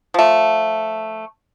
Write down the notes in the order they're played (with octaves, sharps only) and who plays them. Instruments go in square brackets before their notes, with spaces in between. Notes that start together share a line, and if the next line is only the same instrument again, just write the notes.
[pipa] F3 A3